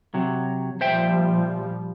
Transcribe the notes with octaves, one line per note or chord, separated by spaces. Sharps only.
C3 F#3
A#2 F3 G3 C5 E5 G5